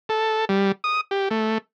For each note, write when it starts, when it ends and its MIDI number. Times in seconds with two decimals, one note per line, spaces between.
0.09 0.45 69
0.49 0.72 55
0.84 1.01 87
1.11 1.29 67
1.31 1.58 57